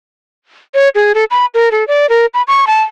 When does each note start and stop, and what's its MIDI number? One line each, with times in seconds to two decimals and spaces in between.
0.74 0.89 73
0.95 1.12 68
1.15 1.25 69
1.31 1.46 83
1.54 1.69 70
1.72 1.86 69
1.88 2.09 74
2.09 2.26 70
2.34 2.42 83
2.48 2.65 85
2.67 2.82 81